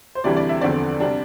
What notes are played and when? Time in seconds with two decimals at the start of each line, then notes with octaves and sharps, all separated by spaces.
0.15 C5
0.24 D2 C3 E3 G3 D4 D5
0.37 D5
0.49 E5
0.61 E2 D3 F3 C4 D5
1.00 C3 G3 D4